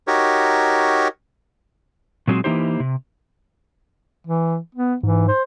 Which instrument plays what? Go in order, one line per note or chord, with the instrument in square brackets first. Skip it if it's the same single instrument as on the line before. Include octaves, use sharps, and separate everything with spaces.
[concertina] D#4 F#4 G4 A#4 C#5
[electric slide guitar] A#2 F#3 G#3 C4 F#4 G#4
E3 A#3 D#4 E4 G4 C5
C3
[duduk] E3
B3
[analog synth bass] G#2 [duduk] E3
[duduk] C5